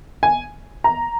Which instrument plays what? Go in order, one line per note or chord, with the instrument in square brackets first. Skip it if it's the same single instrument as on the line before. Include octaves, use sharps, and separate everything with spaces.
[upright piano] G#5
A#5